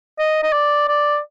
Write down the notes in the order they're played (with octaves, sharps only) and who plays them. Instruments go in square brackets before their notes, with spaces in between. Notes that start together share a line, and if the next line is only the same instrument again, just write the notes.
[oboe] D#5
D#5
D5
D5